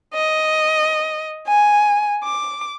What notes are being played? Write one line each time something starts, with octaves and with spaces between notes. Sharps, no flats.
D#5
G#5
D6